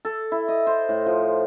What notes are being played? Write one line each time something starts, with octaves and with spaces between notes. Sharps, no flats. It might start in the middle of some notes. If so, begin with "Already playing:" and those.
A4
E4
D#5
C5
A2
F3